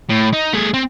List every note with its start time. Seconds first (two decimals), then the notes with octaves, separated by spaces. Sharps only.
0.10 A2
0.33 D#4
0.53 A3 G#4
0.74 C4